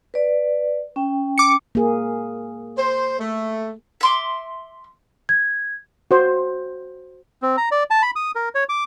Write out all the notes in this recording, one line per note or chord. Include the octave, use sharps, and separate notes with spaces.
B4 D5
C#4 G5
D6 C#7
A#3 G#4
C5
A3
E5 C6 D6
G#6
F#4 C5
C4
A#5
D5
A5
B5
D#6
A#4
C#5
D6